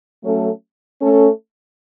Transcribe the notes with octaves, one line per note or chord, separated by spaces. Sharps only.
F#3 A3 C#4 A4
A3 C#4 A4